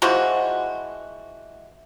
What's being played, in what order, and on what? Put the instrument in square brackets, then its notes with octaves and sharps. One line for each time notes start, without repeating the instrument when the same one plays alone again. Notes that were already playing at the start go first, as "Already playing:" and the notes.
[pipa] E3 F3 G#3 F#4